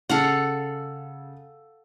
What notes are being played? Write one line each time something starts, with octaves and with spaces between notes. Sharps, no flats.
C#3 A4 F5 F#5